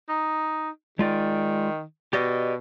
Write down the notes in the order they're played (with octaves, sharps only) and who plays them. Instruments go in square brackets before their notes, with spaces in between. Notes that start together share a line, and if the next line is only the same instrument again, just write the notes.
[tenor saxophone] D#4
[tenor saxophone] D#3 [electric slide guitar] G#3 F4 D5
[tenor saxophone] B2 [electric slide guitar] G4 D5 D#5